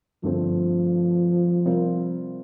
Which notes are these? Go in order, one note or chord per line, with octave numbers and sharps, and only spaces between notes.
G2 D3 F3 A3 C4
C3 G3 C4 F4 A#4